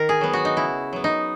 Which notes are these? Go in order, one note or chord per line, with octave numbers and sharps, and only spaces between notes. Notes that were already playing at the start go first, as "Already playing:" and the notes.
Already playing: D#3 A#4
G#4
F#3 B3
F#4
D#4
C#3 E4
F#3 B3
D#4